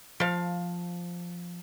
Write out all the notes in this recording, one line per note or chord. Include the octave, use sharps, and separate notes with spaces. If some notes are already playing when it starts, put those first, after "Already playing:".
F3 F5